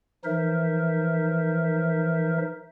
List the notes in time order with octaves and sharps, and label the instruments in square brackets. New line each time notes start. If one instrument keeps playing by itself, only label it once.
[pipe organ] E3 F3 D#4 A#4 C5 E5